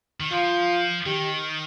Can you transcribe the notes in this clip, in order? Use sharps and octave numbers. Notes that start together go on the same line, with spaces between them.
D#3
F3 F4
D#3 G4